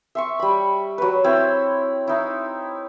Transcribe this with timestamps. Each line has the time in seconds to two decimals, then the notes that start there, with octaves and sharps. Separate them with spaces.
0.15 E5 C6 C#6
0.39 G3 B5
0.98 F#3 B4
1.24 C4 E4 C5 C#5
2.07 D#4 E4